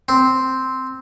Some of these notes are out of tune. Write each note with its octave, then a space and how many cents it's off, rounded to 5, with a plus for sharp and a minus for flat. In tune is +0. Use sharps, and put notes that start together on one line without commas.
C4 -5